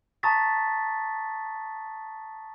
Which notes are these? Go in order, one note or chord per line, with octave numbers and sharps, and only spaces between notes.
A5 A#5 C#6 D#6 A6 B6